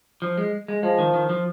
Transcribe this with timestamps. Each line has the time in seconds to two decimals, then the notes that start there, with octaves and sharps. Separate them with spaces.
0.22 F3
0.37 G#3
0.68 G#3
0.83 F3 G#3
0.99 D#3
1.14 D#3
1.29 F3